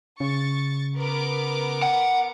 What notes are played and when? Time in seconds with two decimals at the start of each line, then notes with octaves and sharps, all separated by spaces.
0.20 C#3 C#6 A6
0.97 B3 A#4 D6
1.82 F#5